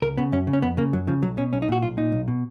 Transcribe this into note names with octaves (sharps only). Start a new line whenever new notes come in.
C#2 A#4
C#3 B3
F#2 C#4
C#3
C#4
F2 B3
C#3 A#3
F#2 F#3
C#3 F3
B1 F#3
B2 C#4
B1 C#4
D#4
A#2 F#4
B1 F4
A#2 D#4
B1
B2